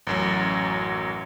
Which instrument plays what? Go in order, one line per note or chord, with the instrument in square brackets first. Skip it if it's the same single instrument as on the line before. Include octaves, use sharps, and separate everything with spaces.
[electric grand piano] A1 F#2 F#3